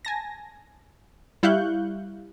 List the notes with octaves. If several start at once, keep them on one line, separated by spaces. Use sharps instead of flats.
G#5 A5 A#6
G3 E4 F5 C#6 F#6 G6